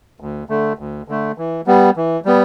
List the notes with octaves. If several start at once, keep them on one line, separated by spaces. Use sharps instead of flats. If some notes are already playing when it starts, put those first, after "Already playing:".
D2
D3 A3
D2
D3 A3
E3
G3 B3
E3
G3 B3